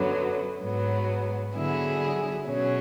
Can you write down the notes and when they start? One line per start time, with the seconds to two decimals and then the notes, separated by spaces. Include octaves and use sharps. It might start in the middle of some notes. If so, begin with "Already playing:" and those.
Already playing: F#2 D3 F#3 B3
0.60 G#2 F#3 B3
1.54 D3 F#3 B3 E4 G#4
2.49 B2 F#3 C#4 G#4